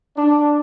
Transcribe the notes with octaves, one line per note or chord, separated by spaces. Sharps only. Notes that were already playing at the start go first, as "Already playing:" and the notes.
D4